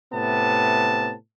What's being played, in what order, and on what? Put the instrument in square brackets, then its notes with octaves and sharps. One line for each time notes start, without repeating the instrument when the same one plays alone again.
[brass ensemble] A2 C3 B3 A5